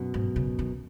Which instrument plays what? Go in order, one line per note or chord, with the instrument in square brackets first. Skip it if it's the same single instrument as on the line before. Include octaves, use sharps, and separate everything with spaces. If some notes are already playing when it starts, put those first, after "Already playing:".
Already playing: [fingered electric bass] F#2 B2
[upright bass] G#2
C#3
D#3